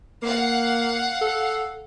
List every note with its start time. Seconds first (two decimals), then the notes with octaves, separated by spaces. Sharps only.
0.23 A#3 F5 F#5
1.21 A4